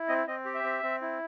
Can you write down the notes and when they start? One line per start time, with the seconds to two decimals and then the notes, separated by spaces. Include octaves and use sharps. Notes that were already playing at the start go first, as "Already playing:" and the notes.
Already playing: E4
0.08 C4 D#5
0.27 C4 D#5
0.45 G4
0.54 E5
0.64 C4
0.83 C4
1.01 E4